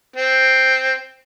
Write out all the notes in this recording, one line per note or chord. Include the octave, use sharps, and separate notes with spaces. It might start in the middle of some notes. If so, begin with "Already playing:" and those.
C4